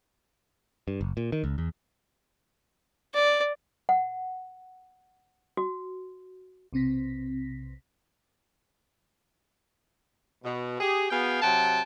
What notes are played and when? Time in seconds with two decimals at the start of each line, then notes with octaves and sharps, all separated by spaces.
0.88 G2
1.01 F#1
1.17 A#2
1.32 D#3
1.44 C#2
1.58 E2
3.15 D5
3.89 F#5
5.57 F#4
6.73 B1 C3 C4 A#6 B6
10.43 B2
10.80 G4 G#4
11.11 B3 F#4 G#4 F5 G5 G#5
11.42 C3 F#3 F#5 G5 A5